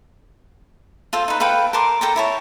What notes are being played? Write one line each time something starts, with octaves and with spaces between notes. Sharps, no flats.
F4 A4 C5
D#4 B4
A4 B4 F5 G5
A#4 A5 C6 D6
A4 G5 A#5
E4 C#5 A5